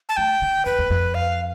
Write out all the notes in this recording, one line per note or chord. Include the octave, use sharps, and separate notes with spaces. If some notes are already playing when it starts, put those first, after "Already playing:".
A5
A3 G5
D3
F2 B4
E2
F2
F5